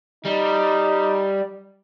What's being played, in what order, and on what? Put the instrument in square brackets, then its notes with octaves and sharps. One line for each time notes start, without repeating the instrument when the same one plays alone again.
[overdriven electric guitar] G3 [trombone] D#4